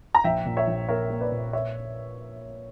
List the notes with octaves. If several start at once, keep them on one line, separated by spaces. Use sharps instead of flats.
A#5
A#1 E5 G5
A#2
C#5 E5
A#1
A#3 A#4 C#5
A#3
B4 D5
A#2
C#5 E5